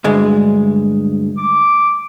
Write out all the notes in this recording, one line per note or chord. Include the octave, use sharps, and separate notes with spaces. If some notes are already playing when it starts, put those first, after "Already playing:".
D2 G2 G#3
D6